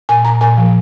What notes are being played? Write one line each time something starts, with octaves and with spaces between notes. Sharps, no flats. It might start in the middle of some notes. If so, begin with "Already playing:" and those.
A#2 G#5
A#2 A#5
A#2 G#5
F3